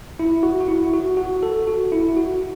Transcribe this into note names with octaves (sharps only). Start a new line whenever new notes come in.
E4
F#4
F#4
E4
F#4
F#4
A4
F#4
E4
F#4